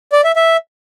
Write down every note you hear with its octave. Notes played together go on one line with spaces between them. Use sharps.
D5
E5
E5